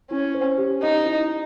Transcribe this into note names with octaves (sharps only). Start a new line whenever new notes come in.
C#4 E4
C5
G4
D#4 D#5
E4